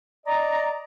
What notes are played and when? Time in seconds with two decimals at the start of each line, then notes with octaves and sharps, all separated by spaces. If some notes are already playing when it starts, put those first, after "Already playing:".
0.25 D5 D#5 A#5